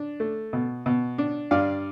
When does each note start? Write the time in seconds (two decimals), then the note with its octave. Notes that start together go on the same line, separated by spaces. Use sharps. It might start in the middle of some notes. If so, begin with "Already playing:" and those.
Already playing: D4
0.20 A3
0.53 B2
0.86 B2
1.18 D4
1.51 G2 D5 F5